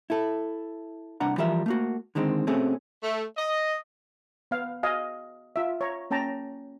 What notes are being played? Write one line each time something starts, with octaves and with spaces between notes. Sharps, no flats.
E4 A4
C2 D4 F#5 A#5
E3 F3 G3 A#4 E5
A3 A#3 F#4
D3 D#3 G#3 C4
B2 A3 C4 C#4 G#4
A3
D#5
B3 F5
F#4 D#5 F5 G#5
F4 E5
C#5 A#5
A#3 C#4 G5 A5 A#5